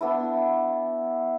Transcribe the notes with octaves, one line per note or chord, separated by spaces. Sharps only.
B3 D4 E4